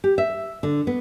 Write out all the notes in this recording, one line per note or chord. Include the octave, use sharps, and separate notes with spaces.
G4
E5
D3
B3